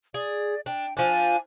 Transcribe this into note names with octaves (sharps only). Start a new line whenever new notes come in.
G#4 D5
D4 G5
F3 D4 G#5